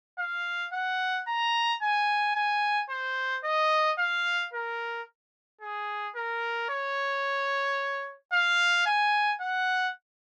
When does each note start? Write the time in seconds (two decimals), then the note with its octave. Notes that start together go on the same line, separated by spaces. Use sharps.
0.19 F5
0.73 F#5
1.28 A#5
1.82 G#5
2.36 G#5
2.90 C5
3.44 D#5
3.99 F5
4.53 A#4
5.61 G#4
6.16 A#4
6.69 C#5
8.33 F5
8.86 G#5
9.41 F#5